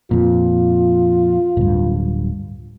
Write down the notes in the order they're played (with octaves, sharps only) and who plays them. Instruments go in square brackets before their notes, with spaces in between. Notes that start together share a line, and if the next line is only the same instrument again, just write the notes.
[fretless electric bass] F2 A#2 [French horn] F4
[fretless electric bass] D1 G2